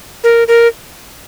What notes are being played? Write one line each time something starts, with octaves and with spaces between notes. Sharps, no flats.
A#4
A#4